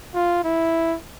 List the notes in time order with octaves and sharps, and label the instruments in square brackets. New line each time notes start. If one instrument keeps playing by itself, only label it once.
[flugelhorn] F4
E4